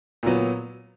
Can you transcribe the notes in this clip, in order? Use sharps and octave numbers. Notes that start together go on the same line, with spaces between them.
A#2 F#3 B3